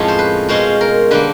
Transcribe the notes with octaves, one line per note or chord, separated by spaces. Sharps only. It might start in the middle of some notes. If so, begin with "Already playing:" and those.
Already playing: F2 A2 F3 G#3 C#4 A4
C5
B4
B2 G#3 C#4 F4 C5
A#4
D3 G3 A#3 B4